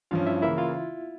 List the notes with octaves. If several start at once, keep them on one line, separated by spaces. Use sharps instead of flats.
G2 F3 C#4 F4 F5
E4 E5
C#3 E3 A#3 E4 E5
F4 F5